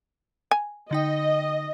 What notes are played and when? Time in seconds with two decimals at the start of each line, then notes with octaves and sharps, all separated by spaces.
0.51 G#5
0.91 D3 D#4 D#5 G5